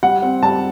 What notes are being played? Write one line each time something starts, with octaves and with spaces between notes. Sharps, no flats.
G3 F#5
C4
G3 A5